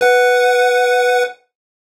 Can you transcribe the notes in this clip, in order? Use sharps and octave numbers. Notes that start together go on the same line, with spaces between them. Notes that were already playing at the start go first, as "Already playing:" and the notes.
B4 F#5